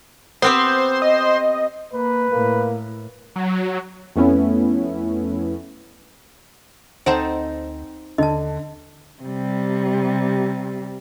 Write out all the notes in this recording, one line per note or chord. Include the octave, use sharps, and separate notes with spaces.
B3 C4 G4 C5
D#5
A#3 B4
A2 A#3
F#3
F2 A3 B3 C#4 E4
D2 C4 D#4 A4 C5 F#5 A5
D#2 D3 D#5 A5
C3 G3